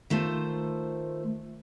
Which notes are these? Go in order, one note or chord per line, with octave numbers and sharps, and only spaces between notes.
D#3 A3 F4 C5 A5